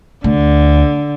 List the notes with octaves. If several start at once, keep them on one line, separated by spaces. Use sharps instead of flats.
D2 D3